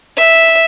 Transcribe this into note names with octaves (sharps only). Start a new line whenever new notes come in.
E5